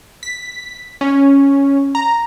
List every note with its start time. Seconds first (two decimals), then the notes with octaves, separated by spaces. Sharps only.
0.23 B6
1.01 C#4
1.95 A#5